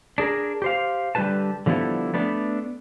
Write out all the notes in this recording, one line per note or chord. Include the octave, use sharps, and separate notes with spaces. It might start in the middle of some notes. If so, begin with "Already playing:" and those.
D4 G#4 A#4
G4 C5 F5
D3 G3 F4 G4 B4 A5
D3 F3 G3 B3 E4 A4
A3 B3 D4